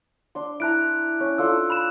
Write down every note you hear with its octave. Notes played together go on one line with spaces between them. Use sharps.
D4 C6
E4 A5 A#5 F#6 D7
C#4
D4 F4 A4 E6
B5 F#6 E7